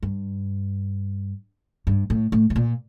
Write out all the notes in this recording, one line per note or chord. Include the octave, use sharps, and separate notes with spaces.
G2
G2
A2
A2
A2
A#2